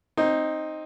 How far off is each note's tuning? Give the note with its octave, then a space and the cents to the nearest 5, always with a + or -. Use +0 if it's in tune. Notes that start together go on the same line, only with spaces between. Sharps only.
C4 +15 D#4 +0